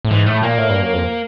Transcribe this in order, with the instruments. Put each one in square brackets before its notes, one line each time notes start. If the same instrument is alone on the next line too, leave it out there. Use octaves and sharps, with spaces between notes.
[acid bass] A2
[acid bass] G#2 [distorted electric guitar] E3
[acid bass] A2 [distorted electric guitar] A3
[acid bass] A#2 [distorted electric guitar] A#3
[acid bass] A2
G2
F#2
F2